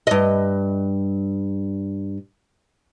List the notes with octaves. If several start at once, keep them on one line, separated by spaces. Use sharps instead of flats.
G2 D#5